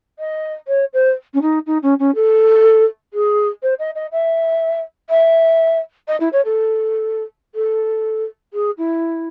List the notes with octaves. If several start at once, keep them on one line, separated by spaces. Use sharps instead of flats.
D#5
C#5
C5
C#4
D#4
D#4
C#4
C#4
A4
G#4
C5
D#5
D#5
E5
E5
D#5
E4
C#5
A4
A4
G#4
E4